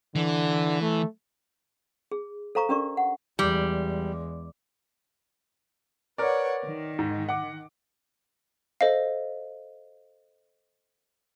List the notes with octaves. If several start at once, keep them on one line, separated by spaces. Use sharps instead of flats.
D3 E3
A3
G#4
A4 C5 F5 A#5 C#6 D6
C#4 D4 G4 A#4 D5 C#6
F#5
E2 G3 G#3
A#4 B4 C#5 D5 F#5
D#3
G#2
F#5 D6
A4 C5 D#5 F5